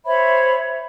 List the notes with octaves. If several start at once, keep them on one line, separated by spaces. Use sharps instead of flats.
C5 C#5 E5 B5